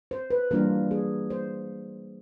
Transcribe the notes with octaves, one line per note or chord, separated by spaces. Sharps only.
C5
B4
E3 G3 A#3 D4 F4 A#4
G#4
C5